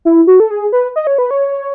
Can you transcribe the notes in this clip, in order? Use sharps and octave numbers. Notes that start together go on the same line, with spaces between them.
E4
F#4
A4
G#4
B4
D#5
C#5
B4
C#5